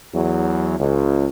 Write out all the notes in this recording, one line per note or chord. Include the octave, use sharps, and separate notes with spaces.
E2 F#3
C#2